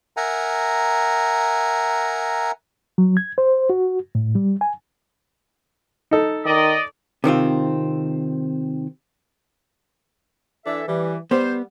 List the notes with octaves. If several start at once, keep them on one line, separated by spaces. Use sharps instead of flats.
A#4 E5 F#5 G#5 A#5
F#3
G#6
C5
F#4
A2
G3
G#5
D#4 A4
D#3 D5 D#5
C3 D#3 C4 F4
E3 D4 A4 E5
E3 G3
G3 B3 C5